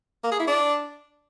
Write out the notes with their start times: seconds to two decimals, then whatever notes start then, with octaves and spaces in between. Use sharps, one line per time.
0.24 A#3
0.32 G#4
0.40 E4
0.47 D4